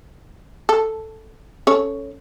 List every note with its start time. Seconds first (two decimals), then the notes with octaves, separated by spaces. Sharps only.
0.69 A4
1.67 C#4 A4 C#5